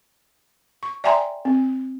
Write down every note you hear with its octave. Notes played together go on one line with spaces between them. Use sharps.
C#6
D5 E5 G5 G#5 A#5 C6
C4